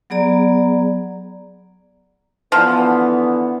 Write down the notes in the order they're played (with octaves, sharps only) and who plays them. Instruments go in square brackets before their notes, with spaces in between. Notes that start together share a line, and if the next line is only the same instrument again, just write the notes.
[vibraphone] F#3 B3 G#4 D5 A#5
[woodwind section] D3 E3 B3 [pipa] F3